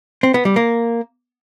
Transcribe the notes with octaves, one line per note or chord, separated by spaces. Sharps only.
C4
B3
G3
A#3